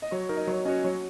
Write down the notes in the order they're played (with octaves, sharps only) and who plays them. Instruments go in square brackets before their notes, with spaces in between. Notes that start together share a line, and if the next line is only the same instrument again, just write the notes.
[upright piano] D#5
[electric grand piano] F#3 [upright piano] C#5
[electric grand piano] D#4 A#4 C#5
[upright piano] D#5
[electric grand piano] F#3 [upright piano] C#5
[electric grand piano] C#4 [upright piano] D#5
[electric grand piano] F#4 C#5
[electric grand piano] F#3 [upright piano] C#5